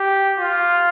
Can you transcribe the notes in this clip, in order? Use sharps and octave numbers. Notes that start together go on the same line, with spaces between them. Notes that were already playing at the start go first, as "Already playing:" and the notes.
Already playing: G4
F4